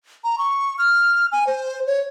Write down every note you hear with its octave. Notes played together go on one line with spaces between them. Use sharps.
A#5
C#6
F6
G#5
C5
C#5